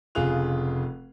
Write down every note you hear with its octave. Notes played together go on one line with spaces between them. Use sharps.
F1 C#3 F4 G#4 F#6 F7